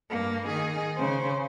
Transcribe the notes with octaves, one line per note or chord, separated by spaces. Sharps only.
G2 A#3
D#3 G#4
C#3 C5